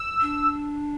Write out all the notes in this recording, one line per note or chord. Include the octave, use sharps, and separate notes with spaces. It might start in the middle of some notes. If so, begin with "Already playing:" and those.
Already playing: E6
D4